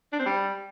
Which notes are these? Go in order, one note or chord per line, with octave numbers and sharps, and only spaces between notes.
D4
C4
G3